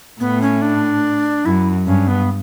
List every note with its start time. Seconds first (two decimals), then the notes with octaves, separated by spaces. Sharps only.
0.20 A2 B3
0.42 C#4
0.62 D4
1.45 F#2 E4
1.87 G2 C#4
2.08 B3